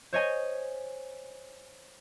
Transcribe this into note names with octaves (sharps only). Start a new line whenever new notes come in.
C5 C#5 D#5 G#5